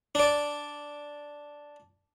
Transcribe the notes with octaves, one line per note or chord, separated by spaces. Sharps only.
D4 D5